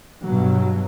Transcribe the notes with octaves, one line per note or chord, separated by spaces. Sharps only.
G2 B2 F#3